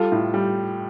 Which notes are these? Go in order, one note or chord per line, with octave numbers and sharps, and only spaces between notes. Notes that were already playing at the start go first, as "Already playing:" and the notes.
Already playing: G3 F4 A4
A2
G3